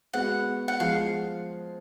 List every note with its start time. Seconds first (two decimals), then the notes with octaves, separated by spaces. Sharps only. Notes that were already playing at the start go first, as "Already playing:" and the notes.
0.13 G#3 B3 F#4 F#5
0.68 F#5
0.80 F3 G#3 F5